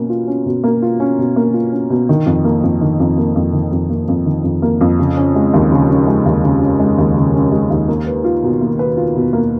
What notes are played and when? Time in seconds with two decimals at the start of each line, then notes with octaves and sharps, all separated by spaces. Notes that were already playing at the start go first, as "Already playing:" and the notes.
Already playing: B2 A#3 C#4
0.10 F4
0.27 C#4
0.46 B2
0.64 A#3
0.82 F4
1.00 C#4
1.18 B2
1.36 A#3
1.54 F4
1.72 C#4
1.90 B2
2.09 D#3
2.26 F2
2.44 A#3
2.63 F2
2.81 D#3
3.00 F2
3.18 A#3
3.36 F2
3.53 D#3
3.72 F2
3.90 A#3
4.08 F2
4.26 D#3
4.44 F2
4.62 A#3
4.81 F2
4.99 C#3
5.17 C#4
5.35 G#3
5.54 D#2
5.72 C#3
5.89 C#4
6.07 G#3
6.26 D#2
6.44 C#3
6.61 C#4
6.80 G#3
6.98 D#2
7.17 C#3
7.35 C#4
7.52 G#3
7.70 D#2
7.88 A#3
8.07 B4
8.24 F4
8.44 B2
8.61 A#3
8.79 B4
8.97 F4
9.16 B2
9.33 A#3